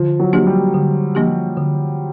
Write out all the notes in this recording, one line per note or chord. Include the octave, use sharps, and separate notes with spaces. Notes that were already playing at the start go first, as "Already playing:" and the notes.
Already playing: D3 F3
F#3
F3 A#3 D4 G4
G3
D3
F3 A#3 D4 G4
D3